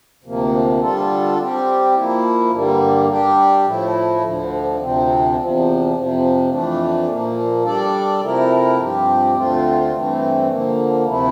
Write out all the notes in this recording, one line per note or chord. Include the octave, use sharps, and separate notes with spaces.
D2 C3 F3 A#3
D3 G3 D4 F4 A4
G3 C4 G4
F3 A#3 E4
G2 D3 G3 A#3
G3 D4 G4
A2 F3 A3 E4
D2 D3 F3
D2 C3 F3 C4
E2 C3 F3
F2 C3 F3
F2 E3 A3 D4
A#2 F3 A#3
G3 D4 A4 D5
C3 F3 A3 E4 A#4
G2 F3 C4 G4
D2 D3 A3 C4 F4
G2 E3 A3 C4
D3 F3 A#3
D2 C3 F3 A3 E4